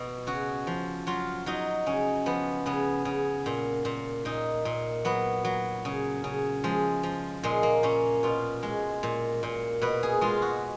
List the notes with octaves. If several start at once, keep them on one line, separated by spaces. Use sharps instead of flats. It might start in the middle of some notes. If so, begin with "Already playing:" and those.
Already playing: B2
C#3 F#4
F3
F#3 F4
F#3 D#4
C#3 C#4
F3 B3
C#3 B3
C#3
A#2
A#2
A#2 D#4
A#2
F#3 B3
F#3
C#3
C#3
F3 G#3
F3
A#2 G#3
A#3
A#2 C#4
B2 F4
G#3
A#2
A#2
B2 B4
G#4
G#3 F4
F#4